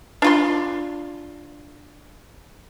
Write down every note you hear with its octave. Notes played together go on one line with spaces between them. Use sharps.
D4 F4 C6